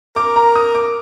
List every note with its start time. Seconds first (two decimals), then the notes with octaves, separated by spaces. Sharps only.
0.16 A#4 D6
0.36 A#5
0.55 D#6
0.75 D6